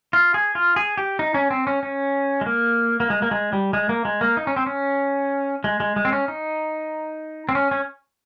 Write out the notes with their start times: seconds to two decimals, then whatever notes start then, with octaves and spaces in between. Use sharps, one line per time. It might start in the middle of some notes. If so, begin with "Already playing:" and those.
0.13 F4
0.34 G#4
0.55 F4
0.76 G#4
0.98 G4
1.19 D#4
1.34 C#4
1.51 C4
1.67 C#4
1.83 C#4
2.41 G#3
2.46 A#3
3.00 A#3
3.10 G#3
3.22 A#3
3.31 G#3
3.53 G3
3.73 G#3
3.89 A#3
4.05 G#3
4.21 A#3
4.37 D#4
4.47 C#4
4.56 C4
4.66 C#4
5.64 G#3
5.80 G#3
5.96 G#3
6.05 C4
6.12 C#4
6.28 D#4
7.49 C4
7.55 C#4
7.71 C#4